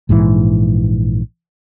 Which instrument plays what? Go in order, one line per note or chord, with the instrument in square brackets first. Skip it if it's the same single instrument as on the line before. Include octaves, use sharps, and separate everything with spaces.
[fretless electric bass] A#1 G#2 B2 E3